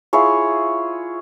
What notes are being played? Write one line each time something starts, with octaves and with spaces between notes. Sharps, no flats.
E4 F4 G#4 C#5